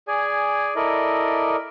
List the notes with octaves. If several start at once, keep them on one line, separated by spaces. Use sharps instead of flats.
G#4 D5 G#5
E4 A4 A#4 D5 D#5